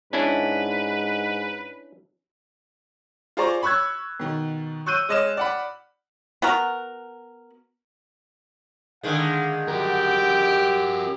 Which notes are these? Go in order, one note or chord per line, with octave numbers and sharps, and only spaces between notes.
G#2 C#4 D4 E4 B4
F4 G#4 C5 D5 A#5 C#6
B5 C#6 E6 F#6 G#6
B2 D#3
C#6 E6 F#6 G6 D#7
G#3 C#5 D#5 F6 E7
D5 F#5 B5
B3 F#4 A#4
D3 D#3 G#3 F5
F#4 G4 A#4 G5